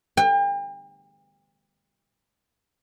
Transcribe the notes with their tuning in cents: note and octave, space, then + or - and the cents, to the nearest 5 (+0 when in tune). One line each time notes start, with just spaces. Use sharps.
G5 +40